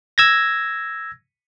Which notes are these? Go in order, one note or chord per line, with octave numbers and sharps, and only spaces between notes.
E6 G#6 A#6